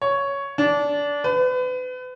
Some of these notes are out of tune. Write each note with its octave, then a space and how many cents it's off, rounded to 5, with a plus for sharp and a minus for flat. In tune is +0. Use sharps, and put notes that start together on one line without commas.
C#5 +5
D4 -20
B4 +35